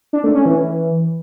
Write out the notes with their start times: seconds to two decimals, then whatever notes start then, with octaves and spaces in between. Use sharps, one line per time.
0.13 D4
0.24 A3
0.35 C#4
0.46 E3